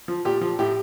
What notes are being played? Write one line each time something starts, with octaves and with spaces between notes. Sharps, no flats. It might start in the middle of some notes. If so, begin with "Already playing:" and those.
F3
A#2 G4
F3
A2 G4